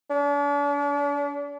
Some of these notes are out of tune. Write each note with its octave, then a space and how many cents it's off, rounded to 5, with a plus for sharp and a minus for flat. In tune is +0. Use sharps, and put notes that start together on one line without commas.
D4 -40